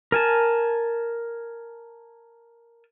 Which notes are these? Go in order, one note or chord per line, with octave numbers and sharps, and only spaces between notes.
A#4 G#5 A5